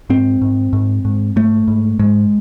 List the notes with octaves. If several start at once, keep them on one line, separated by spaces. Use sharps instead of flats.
G#2 C4
G#2
G#2
G#2
G#2 A3
G#2
G#2 G#3